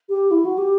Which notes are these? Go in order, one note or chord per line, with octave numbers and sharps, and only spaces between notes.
G4
E4
F#4
G4